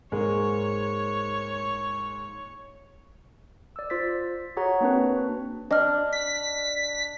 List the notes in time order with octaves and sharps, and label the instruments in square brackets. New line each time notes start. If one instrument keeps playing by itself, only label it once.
[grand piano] G#2 G#3 A#3 [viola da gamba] C#5
[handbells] D5 E6
F4 C5 A6 B6
F#4 G#4 C#5 F#5 A#5
A#3 C4 D4 F#4 B4
[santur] D4 [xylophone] D#5 F6
[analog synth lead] B6